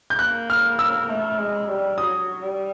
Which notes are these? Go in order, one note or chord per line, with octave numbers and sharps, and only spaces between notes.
G6
A#3 F#6
F6
E6
A3
G#3
G3
F#3 D#6
G3